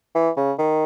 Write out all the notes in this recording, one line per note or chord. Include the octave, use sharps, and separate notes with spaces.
E3
C#3
D#3